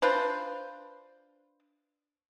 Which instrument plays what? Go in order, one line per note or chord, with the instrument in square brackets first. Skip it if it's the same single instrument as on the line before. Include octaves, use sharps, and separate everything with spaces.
[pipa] D4 F4 B4 C5